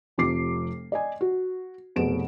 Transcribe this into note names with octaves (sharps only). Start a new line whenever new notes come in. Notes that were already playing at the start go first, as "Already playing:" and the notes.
F1 C3 F3 D6 C7
D5 D#5 G#5
F#4
F1 B2 G#4 D7 E7